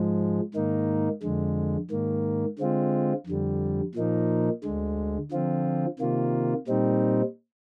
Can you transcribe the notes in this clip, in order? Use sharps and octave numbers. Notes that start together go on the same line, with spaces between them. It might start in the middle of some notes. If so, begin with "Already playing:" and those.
Already playing: G#2 F3 G#3
G#2 D#3 A#3 D#4
F2 D3 G#3
G#2 D#3 A#3
D3 G#3 C4 F4
F2 D3 G3
A#2 F3 A#3 D#4
D2 D3 G#3
D3 F3 C4 F4
C3 D#3 A#3 F4
A#2 G3 C4 D#4